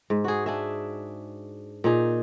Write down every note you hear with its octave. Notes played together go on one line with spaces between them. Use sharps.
G#2
F#4 G#4
D4 G#4 E5
A#2 D#4 G#4